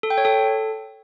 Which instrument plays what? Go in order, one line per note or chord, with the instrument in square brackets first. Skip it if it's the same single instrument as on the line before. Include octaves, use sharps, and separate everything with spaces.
[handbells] A4
G5
C#5
A4